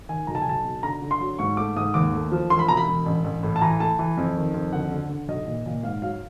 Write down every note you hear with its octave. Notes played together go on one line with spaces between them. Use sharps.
D#3 G#5
B1 A#5
A5
G#5
B1 A5
B2
D3 A#5
D3
C6
F#3
G#2 C#6
A3 D6
G#2 D#6
D#2 D6
A3
F3
E1 C6
B5
B2 A#5
B5
E1
A1
A1
A2
A5
E3 A#5
A3 A5
E3
F2
D#3
F2
D2 F#5
D3
D3
B1 D#5
A#2
A#2
G#2 F5
F#3 F5